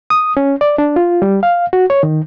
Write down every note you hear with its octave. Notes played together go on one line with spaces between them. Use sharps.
D#6
C#4
D5
D4
F4
G3
F5
F#4
C#5
D#3